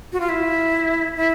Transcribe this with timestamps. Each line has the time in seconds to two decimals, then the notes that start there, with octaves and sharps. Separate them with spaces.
0.13 F#4
0.20 F4
0.29 E4
1.16 E4